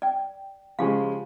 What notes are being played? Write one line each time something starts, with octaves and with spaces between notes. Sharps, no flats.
D5 G5
C#3 F3 G#3 G4 F5